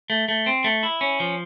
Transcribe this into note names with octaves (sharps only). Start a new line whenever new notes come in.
A3
A3
C4
A3
E4
C#4
F3